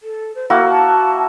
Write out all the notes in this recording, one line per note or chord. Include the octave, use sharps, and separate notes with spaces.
A4
C5
A#3 E4 F#4 A#4
A5